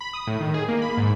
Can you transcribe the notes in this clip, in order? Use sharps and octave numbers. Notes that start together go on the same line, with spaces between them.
B5
D#6
A2
D#3
G#4
A#3
B5
G#2